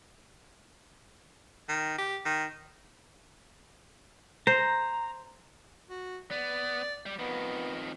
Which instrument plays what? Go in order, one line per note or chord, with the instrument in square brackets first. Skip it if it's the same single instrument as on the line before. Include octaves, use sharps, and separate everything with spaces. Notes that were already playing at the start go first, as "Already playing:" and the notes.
[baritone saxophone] D#3
G4
D#3
[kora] C5 [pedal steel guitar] A#5
[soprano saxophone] F#4
[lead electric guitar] B3 [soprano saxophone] D5
[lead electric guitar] G3
[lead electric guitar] F2 D#3 [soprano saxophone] B3